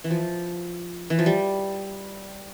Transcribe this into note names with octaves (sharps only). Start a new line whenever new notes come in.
E3
F3
E3
F3
G3